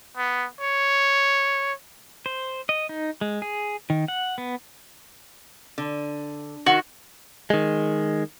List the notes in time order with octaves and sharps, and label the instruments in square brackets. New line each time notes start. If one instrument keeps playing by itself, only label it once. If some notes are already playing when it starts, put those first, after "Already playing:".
[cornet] B3
C#5
[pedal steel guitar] C5
D#5
D#4
G#3
G#4
D#3
F#5
B3
[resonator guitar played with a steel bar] D3
[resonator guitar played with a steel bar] D#3 [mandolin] F#4
[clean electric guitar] D#3 G#3